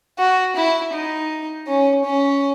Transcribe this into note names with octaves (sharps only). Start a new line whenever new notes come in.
F#4
E4
D#4
C#4
C#4